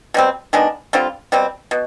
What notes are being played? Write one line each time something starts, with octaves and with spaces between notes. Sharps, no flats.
B2 G3 C4
D#3 G#3 B3 D4
D3 G3 C4 F4
B2 G3 C4
B2